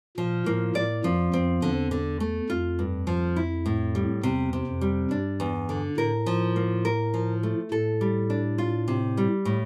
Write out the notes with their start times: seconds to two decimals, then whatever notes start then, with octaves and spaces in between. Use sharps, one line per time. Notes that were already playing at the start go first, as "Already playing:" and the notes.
0.17 A#2 F3
0.46 A2 A#3
0.75 A2 D5
1.04 F2 F3
1.33 F2 C4
1.62 E2 D3
1.91 D3
2.20 A3
2.49 F2 F4
2.79 G2
3.07 F3
3.36 E4
3.66 A2
3.95 G3
4.23 E2 C3
4.53 C3
4.67 F2
4.81 G3
5.11 G2 D4
5.40 E2
5.69 D3
5.97 A2 A#4
6.26 F3
6.56 A#3
6.85 A#4
7.14 F3
7.43 A3
7.71 A2 A4
8.01 G3
8.30 D4
8.58 F4
8.88 C3
9.17 G3
9.45 A2